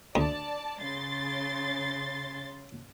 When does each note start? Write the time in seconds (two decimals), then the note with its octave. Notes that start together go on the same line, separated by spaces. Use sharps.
0.15 D2 D5 A5
0.80 C#3 C6 A6